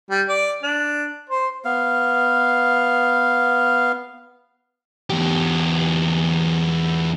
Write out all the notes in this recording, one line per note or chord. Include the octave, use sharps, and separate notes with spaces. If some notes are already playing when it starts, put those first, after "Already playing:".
G3
D5
D4
C5
B3 F5
E2 G4